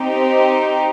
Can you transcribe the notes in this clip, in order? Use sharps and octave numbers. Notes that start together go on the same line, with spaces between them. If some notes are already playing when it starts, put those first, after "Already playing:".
Already playing: C4 D#4 G4